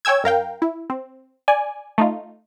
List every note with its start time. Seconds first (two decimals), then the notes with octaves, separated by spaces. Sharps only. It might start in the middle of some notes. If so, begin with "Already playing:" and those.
0.05 C#5 G5 G#5 E6 G#6
0.24 F#2 A#4 F5 G5
0.62 E4
0.90 C4
1.48 D5 G#5
1.98 A3 D#4 F4